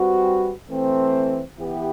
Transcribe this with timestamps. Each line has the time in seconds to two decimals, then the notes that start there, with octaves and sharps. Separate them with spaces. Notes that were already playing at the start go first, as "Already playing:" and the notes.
Already playing: G3 C4 F#4 B4
0.69 E3 A3 C4
1.59 E3 B3 E4 G4